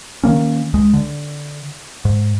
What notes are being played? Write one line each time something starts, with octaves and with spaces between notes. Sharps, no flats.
D#3 F3 A#3 C#4
C#2 G#3
D3
G#2